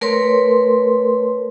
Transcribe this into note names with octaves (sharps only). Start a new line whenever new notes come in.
A3 A#4 B4 C#5 C6